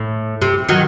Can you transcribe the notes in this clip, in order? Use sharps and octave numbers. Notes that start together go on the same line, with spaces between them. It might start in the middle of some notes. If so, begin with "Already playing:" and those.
Already playing: A2
C3
D#3 F#3